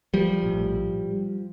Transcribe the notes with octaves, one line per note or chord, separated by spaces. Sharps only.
F3 G3
A#1 A2